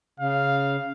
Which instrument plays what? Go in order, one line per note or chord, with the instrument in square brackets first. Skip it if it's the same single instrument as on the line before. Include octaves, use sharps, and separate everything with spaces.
[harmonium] C#3 [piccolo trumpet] F5